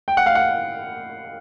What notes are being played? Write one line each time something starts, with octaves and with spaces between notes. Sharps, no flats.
G5
F#5
F5
F#5